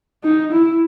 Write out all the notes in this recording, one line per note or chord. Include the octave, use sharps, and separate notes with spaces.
D#4
E4